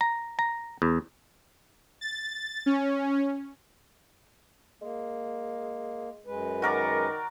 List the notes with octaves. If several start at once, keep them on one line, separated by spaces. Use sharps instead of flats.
A#5
A#5
E2
A6
C#4
G#3 A#3
F#2 G#3 B4
D#3 F#4 A#4 D5